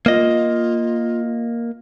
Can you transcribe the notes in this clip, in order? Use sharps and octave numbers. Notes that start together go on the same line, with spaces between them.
A#3 F4 D#5